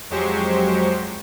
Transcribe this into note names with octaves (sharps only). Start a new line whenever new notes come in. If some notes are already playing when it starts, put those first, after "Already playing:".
F2 F#3 G#3 G4 C5 C#6